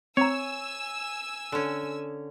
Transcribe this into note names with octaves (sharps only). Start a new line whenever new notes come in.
C4 C#5 G#5 A#5 E6
D3 C#4